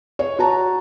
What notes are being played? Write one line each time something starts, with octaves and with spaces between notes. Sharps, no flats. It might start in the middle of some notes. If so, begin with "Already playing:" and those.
C#5
F#4 A5 A#5